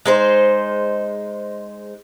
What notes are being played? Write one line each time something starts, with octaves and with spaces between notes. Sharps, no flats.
G#3 D#4 C5